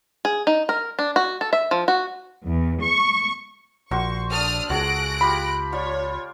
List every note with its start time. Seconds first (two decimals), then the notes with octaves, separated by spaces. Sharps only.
0.25 G#4
0.47 D#4
0.69 A#4
0.99 D4
1.16 F#4
1.41 A4
1.53 E5
1.71 F3
1.88 F#4
2.45 E2
2.82 C#6
3.91 A#1 F#4 C5 C6 C#6
4.32 D4 A4 D#6 F6
4.70 C#2 F#4 G#4 A4 F#6 A#6 D7
5.21 F4 G4 B5
5.72 F4 C#5 D5